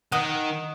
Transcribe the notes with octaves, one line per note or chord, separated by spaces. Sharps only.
D#3 D#5 F#5